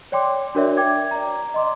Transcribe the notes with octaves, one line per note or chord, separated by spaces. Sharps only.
C#5 D5 G5 C6 D6
D4 F#4 A#4 C#5 D5 E5
G5 D6 G#6
D5 A#5
D#5 C6 D6